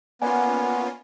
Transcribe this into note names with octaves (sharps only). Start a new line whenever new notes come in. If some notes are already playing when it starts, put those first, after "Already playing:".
A#3 B3 C#4 F4 D5 F#5 G#5